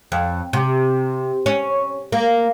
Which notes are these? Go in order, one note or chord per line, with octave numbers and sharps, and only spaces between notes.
F2
C3
C#4
A#3